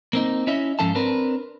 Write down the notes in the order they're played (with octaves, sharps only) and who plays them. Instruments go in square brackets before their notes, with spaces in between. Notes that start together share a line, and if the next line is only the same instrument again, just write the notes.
[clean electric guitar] A#3 C4 D#4
C#4 E4 C#5 D#5 E5
G#2 F3 C#4 A4 F5 A5
C4 D4 A#4 B4